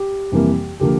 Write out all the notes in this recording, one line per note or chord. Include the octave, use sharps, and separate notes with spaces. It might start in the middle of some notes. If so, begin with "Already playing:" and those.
Already playing: G4
F2 C3 E3 G3 A#3
D3 F3 A#3 G4